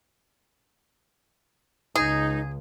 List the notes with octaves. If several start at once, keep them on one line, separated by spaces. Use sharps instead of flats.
C#2 D#4 G#4